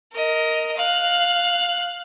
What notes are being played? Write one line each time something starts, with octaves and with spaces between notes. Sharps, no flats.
A#4 D#5
F5 F#6